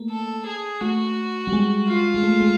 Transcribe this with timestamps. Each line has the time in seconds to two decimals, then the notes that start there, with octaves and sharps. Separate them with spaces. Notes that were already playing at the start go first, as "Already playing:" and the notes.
Already playing: A3 A#3
0.10 A4
0.46 G#4
0.80 A3 F#4
1.47 G3
1.53 G#3
1.87 F4
2.14 G#3
2.23 A3
2.41 G#3